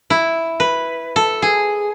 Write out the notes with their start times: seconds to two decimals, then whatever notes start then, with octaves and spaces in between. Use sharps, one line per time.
0.10 E4
0.60 B4
1.16 A4
1.42 G#4